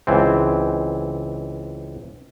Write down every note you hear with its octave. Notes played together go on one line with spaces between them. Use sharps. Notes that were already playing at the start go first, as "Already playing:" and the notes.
C#2 E3 C4